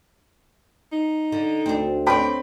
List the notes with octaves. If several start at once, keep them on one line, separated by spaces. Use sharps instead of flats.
D#4
D3
D2 C4 D4
C4 B4 C#5 D5 G5 B5